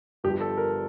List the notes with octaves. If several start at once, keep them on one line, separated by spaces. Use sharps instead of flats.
G1 G2 F3 G4
A4
A#4